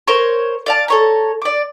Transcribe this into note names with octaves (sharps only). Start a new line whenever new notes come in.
A#4 C5 C#5
D5 F5 A5
A4 C#5 A#5
D5 D6